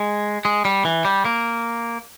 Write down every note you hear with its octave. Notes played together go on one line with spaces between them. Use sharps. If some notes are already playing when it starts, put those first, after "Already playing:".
Already playing: G#3
G#3
G3
E3
G3
A#3